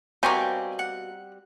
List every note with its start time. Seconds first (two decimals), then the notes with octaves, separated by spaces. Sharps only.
0.23 B2 G3 A#3 C4 G4 G#5 C#6 D6
0.79 F#5